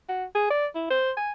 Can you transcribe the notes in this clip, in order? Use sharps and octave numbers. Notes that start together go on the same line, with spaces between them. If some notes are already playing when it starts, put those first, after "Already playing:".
F#4
G#4
D5
E4
C5
G#5